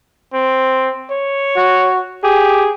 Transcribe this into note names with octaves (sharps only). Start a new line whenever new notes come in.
C4
C#5
F#4
G4 G#4